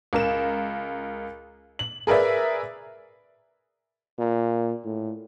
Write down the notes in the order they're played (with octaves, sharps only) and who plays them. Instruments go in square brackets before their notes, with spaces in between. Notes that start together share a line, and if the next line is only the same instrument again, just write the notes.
[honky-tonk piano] C#2 A#4 E7
F#7
G#4 A#4 B4 D5 E5
[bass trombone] A#2
A2